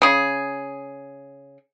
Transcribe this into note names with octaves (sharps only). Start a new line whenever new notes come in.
C#3 G#4